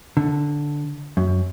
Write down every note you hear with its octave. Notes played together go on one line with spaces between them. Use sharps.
D3
F#2